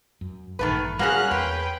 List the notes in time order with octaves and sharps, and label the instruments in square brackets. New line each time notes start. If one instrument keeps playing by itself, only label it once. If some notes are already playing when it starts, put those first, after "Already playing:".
[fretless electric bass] F#2
[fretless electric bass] A1 G2 A#2 [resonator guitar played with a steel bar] D#3 A3 B4
[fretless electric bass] G3 [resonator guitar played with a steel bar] A#3 C4 C#4 [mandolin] F#4 G#4 [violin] F6 F#6
[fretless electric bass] E2 [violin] B4 G5 [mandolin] C6